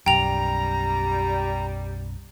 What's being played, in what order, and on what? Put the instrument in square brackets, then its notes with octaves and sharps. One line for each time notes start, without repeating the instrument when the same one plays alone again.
[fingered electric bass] B1 F#2 [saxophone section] G3 [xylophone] G5 F7 [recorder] A#5